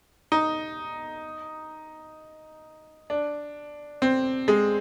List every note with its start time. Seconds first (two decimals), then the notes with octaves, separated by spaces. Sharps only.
0.32 D#4
3.10 D4
4.02 C4
4.48 G#3